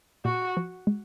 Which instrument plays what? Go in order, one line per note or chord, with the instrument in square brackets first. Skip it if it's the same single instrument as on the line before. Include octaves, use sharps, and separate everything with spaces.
[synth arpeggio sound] A#2 [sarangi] F#4
[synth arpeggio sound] F3
G#3